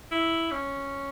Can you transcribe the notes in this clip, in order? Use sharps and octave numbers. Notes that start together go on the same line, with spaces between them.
E4
C#4